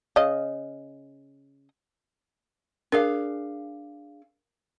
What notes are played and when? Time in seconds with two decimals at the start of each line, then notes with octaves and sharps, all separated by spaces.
0.16 C#3 D#5
2.92 D4 G#4 A#4 F5